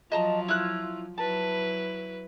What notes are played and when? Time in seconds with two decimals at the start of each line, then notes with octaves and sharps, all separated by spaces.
0.12 F3 F#3 F4 D#5 A5 A#5
0.48 E4 F6 F#6
1.18 F#3 E4 B4 A5